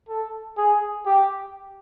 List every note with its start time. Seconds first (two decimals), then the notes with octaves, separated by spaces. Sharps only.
0.09 A4
0.57 G#4
1.06 G4